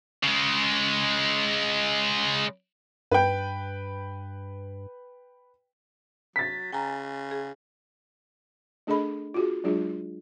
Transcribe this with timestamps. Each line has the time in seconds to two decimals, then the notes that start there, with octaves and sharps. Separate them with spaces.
0.23 C#3 G#3
3.12 G2 B4 G5
6.36 F#3 A6 B6
6.73 C#3 G5 G#5 A#5
7.31 G#4
8.87 A3 D4 G#4 A4 D#5 B5
9.34 F4 F#4 G#4
9.64 F#3 G#3 D4 F4 G#4